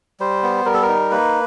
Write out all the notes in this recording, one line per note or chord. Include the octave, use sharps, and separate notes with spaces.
G3 C5
B3
G3 A#4
A4
A#4
D#4
A#3 B4